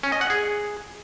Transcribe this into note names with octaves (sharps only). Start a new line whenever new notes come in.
C#4
D#5
F#5
G#4